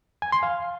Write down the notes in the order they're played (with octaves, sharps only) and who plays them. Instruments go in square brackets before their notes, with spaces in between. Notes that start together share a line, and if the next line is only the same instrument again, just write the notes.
[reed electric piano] G#5
C6
F5